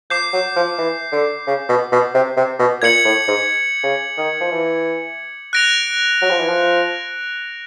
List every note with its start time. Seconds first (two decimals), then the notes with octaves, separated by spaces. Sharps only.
0.10 F3 D6 G6 C7
0.33 F#3
0.56 F3
0.79 E3
1.12 D3
1.47 C#3
1.69 B2
1.92 B2
2.14 C3
2.37 C3
2.59 B2
2.82 A#2 G#6 C#7 F#7
3.05 A2
3.28 G#2
3.83 C#3
4.17 D#3
4.41 F3
4.52 E3
5.53 F#6 A#6 D7 F7
6.22 F#3
6.31 F3
6.40 E3
6.49 F3